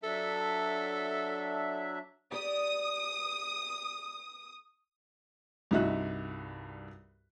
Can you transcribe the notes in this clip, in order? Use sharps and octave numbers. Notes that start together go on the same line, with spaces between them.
F#3 D4 A4 E5
G4 D5 D#6
C2 G2 D#4 F#4 E5 F#6